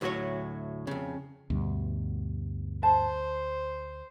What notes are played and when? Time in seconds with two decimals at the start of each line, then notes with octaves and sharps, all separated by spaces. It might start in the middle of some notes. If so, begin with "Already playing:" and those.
0.01 D2 A2 F#3 F#4 C#5
0.87 F2 C#3
1.50 D2 G2 B2
2.83 C5 A5